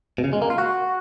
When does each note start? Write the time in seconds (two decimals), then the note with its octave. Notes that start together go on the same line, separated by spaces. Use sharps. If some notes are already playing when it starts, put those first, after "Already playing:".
0.18 B2
0.24 C#3
0.33 G#3
0.42 A#3
0.50 F4
0.58 F#4